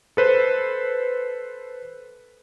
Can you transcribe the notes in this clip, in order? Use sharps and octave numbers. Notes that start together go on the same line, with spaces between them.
A4 B4 C5